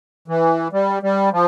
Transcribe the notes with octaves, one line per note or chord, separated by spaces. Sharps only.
E3
G3
G3
F3